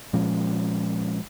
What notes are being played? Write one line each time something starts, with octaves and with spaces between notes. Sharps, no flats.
A#2 F3 G#3 C#4